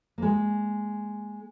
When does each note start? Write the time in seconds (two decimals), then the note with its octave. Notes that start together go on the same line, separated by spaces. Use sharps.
0.18 G#3 A#3